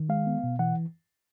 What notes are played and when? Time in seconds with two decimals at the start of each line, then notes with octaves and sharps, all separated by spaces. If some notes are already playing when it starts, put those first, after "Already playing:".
Already playing: D#3
0.09 G#3 F5
0.27 B3
0.44 B2
0.59 E3 F#5